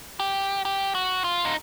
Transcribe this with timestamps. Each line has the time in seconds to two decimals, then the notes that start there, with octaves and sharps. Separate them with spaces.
0.20 G4
0.65 G4
0.95 F#4
1.24 F4
1.45 D#4